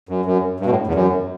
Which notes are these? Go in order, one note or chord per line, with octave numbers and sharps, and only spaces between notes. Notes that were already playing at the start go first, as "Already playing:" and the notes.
F#2
F#2
G2
B2
A2
E2
F#2